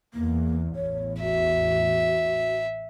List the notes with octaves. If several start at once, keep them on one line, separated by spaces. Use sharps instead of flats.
E2 A#3
A1 E2 A2 C#5
F#4 E5